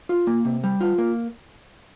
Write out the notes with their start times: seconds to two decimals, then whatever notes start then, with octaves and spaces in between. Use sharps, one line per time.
0.09 F4
0.27 A#3
0.45 C3
0.64 G3
0.81 F4
0.98 A#3